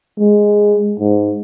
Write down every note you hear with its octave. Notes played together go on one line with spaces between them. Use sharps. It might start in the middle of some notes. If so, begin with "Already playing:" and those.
G#3
G#2